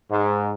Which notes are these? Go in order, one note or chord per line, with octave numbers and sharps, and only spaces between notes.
G#2